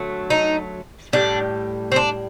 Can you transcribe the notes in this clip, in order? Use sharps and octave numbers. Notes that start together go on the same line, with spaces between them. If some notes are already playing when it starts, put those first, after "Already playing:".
Already playing: D3 F#3 A3
D#4
A2 G3 D4
C4
D4